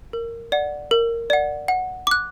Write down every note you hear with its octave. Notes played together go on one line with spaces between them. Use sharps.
A#4
D5 F#5
A#4
D5 F#5
F#5
D6 F#6